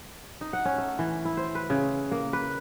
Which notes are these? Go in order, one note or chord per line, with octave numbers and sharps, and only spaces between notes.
D#4
F#5
C#4
A3
E3
E4
C5
B4
C#3
A#3
B4